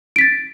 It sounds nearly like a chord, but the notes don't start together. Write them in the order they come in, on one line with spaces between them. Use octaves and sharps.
D7 B6 A6